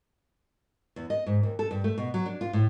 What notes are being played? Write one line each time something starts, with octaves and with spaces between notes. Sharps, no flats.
E2
D#5
G#2
D#2
A4
G2
A3
B2
F#3
D4
F4
A2